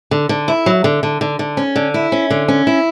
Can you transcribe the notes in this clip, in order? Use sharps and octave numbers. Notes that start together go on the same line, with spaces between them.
D3
D3
E4
F#3
D3
D3
D3
D3
C#4
D3
E4
C#4
D3
C#4
E4